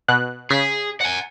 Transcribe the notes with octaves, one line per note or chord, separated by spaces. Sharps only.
B2 F#6
C#3 G#4 B6
F#5 G#5